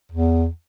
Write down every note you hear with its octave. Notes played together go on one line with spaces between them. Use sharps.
E2